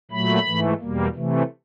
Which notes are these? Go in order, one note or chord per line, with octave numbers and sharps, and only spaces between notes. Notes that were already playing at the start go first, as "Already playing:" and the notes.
A#2 F#3 A3 B5
G#2 E3 A3
E2 B2 G3 A#3
C3 E3 A3